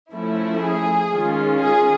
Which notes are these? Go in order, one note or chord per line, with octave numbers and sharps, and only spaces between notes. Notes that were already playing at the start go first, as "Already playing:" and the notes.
F3 A3 C#4 E4
G#4
D#3 G#3 C#4 F4
G#4